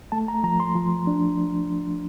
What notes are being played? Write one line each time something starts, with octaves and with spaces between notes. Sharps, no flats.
A3 A5
A#5
F3 A#5
C6
F3
D4